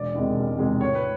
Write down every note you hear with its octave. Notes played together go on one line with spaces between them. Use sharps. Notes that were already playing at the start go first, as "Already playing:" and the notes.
Already playing: E1 D5
E2 C3 D#3 G#3
E1
E2 C3 D#3 G#3
A2 C#5
B4